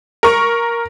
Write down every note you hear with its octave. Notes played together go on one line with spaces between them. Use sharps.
A#4 C#6